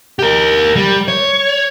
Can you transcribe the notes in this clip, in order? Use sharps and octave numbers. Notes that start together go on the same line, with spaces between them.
G4 A#4
G3
C#5